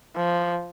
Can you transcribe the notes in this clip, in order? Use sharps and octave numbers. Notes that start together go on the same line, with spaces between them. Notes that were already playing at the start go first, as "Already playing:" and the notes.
F3